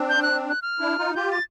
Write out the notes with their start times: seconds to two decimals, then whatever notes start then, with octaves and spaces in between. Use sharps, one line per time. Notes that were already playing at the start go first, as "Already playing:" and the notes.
Already playing: C4 D4
0.09 G6
0.22 F#6
0.49 F#6
0.62 F6
0.79 D4 E4
0.98 D#4 F4
1.15 F4 G4 G6
1.31 A6